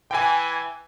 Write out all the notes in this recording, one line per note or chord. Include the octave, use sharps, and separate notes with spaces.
E3 G5 G#5